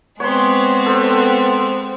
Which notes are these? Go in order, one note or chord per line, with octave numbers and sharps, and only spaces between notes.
G#3 B3 C4 C#5 C6
A4 C5